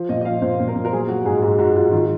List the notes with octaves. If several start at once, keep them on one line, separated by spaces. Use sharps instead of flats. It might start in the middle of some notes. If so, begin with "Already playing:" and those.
Already playing: F3
A#2 D#5
D#5
F3 F5
A#2 C5
A#2
A#4
A#2
A#4
F#3 G#4
F#3 F#4
G#2 G#4
G#2 F#4
G#2 F#4
G#2 F4
D#3 F4